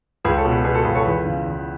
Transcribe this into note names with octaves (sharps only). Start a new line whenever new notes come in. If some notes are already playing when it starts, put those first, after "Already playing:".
C#2 G#4 B4
A4 C#5
B2
G#4 B4
B2 G#4 B4
F#4 A4
C#2 G#4 B4
A4 C#5
E2 G#4 B4
C#3
E2